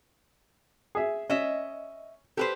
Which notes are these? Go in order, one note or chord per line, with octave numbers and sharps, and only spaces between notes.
G#4 E5
C#4 D#5 E5
G4 A4 B4 C5